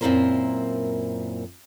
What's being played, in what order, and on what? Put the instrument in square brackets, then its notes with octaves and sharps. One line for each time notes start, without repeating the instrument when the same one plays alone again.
[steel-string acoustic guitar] F#2 A#2 C4 E4 A#4 C5